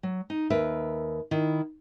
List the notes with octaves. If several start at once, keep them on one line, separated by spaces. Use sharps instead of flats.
F#3
D#4
D#2 A#4 B4 E5
D#3 E4